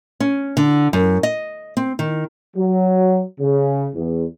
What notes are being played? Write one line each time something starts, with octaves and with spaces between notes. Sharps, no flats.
C#4
D3
F#2
D#5
C4
D#3
F#3
C#3
E2